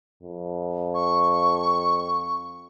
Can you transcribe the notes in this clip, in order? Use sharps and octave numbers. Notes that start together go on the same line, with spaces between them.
F2
C#6